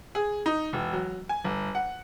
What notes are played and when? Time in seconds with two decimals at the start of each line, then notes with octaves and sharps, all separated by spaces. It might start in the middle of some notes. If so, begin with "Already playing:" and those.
0.15 G#4
0.46 D#4
0.73 E1
0.93 F#3
1.29 G#5
1.44 G1
1.75 F#5